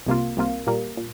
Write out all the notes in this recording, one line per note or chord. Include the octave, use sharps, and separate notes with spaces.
C2 C3 A#3 F4
C2 C3 A#3 F4
A#2 G3 A#3
A#2